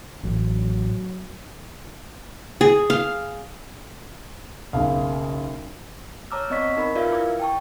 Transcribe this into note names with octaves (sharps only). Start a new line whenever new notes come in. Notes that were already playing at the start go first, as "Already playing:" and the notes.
A1 F#3
G#4
F5
F#1 B1 F5
C#5 A5 A#5 D6 E6 F6
B3 C4 D5 D#5 C#6 B6
D#4 A#4 B5
F4 A#4 B4 D5 E5 F5
E4 D6 G#6
G5 A5 C#6